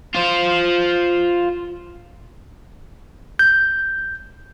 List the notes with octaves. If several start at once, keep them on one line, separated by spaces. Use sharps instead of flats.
F4 C5
G6